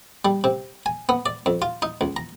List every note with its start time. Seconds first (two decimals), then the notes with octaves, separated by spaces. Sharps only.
0.25 G3
0.44 C3
0.86 G#5
1.09 B3
1.26 D5
1.46 F2
1.62 F4
1.82 D#4
2.01 C#2
2.16 A#5